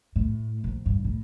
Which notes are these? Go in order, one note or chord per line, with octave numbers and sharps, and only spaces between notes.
A2
A#1
G2
A2